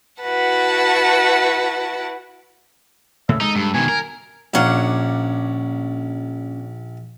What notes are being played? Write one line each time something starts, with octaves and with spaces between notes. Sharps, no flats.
E4 F#4 B4 F#5 A5
A2 C#3 E5
G#3 D#4 A4
G2
B2 D#3 G#5
A#4
A#1 A#3 C#4 D4 F#5